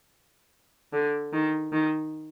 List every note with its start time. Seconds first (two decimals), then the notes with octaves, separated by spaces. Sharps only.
0.93 D3
1.33 D#3
1.72 D#3